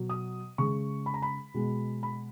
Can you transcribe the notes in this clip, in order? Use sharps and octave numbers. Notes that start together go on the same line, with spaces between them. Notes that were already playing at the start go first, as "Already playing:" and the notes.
Already playing: B2 F#3
D#6
C#3 G#3 C#6
B5
A#5
B5
B2 G#3
B5